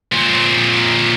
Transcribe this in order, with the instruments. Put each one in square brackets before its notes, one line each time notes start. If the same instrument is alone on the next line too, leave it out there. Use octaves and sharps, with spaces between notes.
[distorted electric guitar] A#2 C4